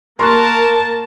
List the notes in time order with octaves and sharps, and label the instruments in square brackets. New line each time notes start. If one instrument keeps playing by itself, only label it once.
[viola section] A#3 A5 [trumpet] A#4 [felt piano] C6 C#6 F#6